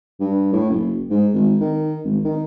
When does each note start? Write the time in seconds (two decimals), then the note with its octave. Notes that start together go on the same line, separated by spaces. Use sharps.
0.20 G2
0.53 A2
0.69 F#1
1.10 G#2
1.34 G#1
1.60 D#3
2.05 G#1
2.24 D#3